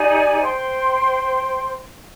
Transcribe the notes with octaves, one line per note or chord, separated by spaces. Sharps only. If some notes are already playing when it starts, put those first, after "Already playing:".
Already playing: D#4 G4 D5 G#5
C5 G5 C6